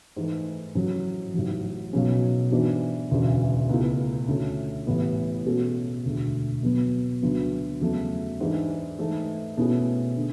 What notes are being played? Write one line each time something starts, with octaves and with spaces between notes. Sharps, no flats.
G#2 E3 A3
A1 A2 F#3 C#4
A1 G#2 F#3
B1 B2 F#3 C#4 G#4
G#2 E3 B3 D4 F#4
E1 D2 C#3 E3
C#2 B2 A3 E4
D2 D3 A3 C#4
A1 A2 E3 B3
B2 G#3 C#4 F#4 A4
E1 D2 D3 A3
B2 F#3 B3
D2 D3 F#3 B3
E2 C#3 F#3 A3
G#2 E3 G#3 D4
G#2 E3 A3
B2 A3 C#4 E4 G#4
D3